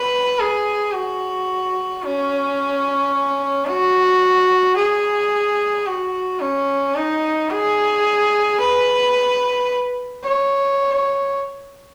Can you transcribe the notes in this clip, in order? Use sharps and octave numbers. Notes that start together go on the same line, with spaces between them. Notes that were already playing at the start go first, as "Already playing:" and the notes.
Already playing: B4
G#4
F#4
C#4
F#4
G#4
F#4
C#4
D#4
G#4
B4
C#5